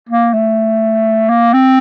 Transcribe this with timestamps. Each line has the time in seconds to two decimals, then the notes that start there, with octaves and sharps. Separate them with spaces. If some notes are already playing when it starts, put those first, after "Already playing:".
0.09 A#3
0.33 A3
1.29 A#3
1.53 C4